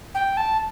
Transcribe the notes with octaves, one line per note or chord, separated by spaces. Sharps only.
G5
A5